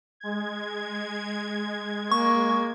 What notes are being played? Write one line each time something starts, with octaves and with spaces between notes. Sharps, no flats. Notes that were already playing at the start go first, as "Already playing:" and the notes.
G#3 G#6
A#3 C#6